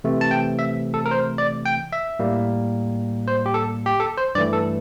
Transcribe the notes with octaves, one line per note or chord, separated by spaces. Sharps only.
C3 E3 A3
A5
G5
E5
A4
A#4
C5
D5
G5
E5
A2 G3 A#3
C5
G4
A4
G4
A4
C5
G2 E3 A3 D5
A4